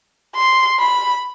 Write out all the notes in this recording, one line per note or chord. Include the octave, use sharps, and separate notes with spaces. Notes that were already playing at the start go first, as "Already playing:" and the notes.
C6
B5